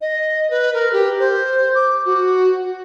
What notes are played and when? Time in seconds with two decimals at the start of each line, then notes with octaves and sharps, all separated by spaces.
0.01 D#5
0.51 B4
0.74 A#4
0.93 G4
1.20 C5
1.75 D6
2.06 F#4